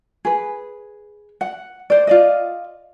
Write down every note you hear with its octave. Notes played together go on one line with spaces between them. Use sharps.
G#4 B4
F#5
C5 D5
F4 D5 D#5